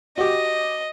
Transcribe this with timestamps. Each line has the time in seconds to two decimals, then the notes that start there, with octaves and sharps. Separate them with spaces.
0.18 F#4 G4 D#5